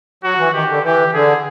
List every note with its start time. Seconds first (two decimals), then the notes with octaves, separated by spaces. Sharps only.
0.23 F#3 F#4
0.38 E3
0.53 D#3 G4
0.69 D3
0.83 E3 G4
1.13 D3 G#4